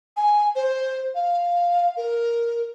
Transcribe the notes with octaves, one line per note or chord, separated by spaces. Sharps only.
G#5
C5
F5
A#4